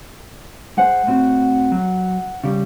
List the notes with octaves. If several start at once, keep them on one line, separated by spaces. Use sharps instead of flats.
G#3 C5 F#5
A2 C4 F#4
F#3
C#3 G3